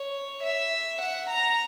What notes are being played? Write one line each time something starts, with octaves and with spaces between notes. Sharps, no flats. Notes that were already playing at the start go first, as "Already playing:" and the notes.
Already playing: C#5
E5
F#5
A#5